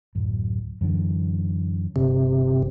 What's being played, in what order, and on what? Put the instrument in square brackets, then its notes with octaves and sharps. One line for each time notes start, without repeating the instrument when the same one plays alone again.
[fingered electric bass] D1 F#2
F#2 D3 E3
[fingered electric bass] G1 [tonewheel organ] C3